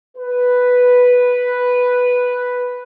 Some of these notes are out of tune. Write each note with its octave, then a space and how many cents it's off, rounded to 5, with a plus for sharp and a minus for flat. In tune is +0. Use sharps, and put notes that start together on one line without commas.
B4 +0